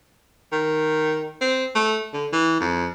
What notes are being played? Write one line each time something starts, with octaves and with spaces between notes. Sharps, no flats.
D#3
C4
A3
D3
E3
F2